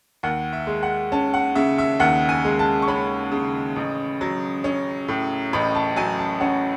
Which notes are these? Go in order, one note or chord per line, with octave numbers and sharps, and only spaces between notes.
D#2 F#5
E5
G#3
F#5
C#4 A5
F#5
C#3 E5
E5
D#2 F#5
G#5
G#3
A5
C#6
C#4 B5
C#3
A1
F#3
C#4
A2
A1 B5
A5
F#3 G#5
A5
C#4 F#5